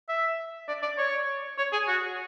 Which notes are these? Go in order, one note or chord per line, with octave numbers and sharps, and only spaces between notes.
E5
D5
D5
C#5
C#5
G#4
F#4